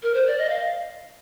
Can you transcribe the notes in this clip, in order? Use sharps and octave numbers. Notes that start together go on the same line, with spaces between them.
A#4
C5
D5
D#5
F5